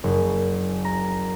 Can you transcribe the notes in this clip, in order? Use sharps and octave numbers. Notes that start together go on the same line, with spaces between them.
F#1
A#5